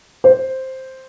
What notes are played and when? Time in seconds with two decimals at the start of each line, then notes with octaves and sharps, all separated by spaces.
0.24 C5